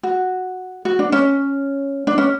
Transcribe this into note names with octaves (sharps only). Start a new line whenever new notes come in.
F#4
F#4
D4
C#4
D4
C#4